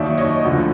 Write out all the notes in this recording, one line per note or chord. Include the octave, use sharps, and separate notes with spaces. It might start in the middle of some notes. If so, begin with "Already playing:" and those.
Already playing: D#2 D#3 F#3 D5 E5
C#5 D#5
D2 D3 F3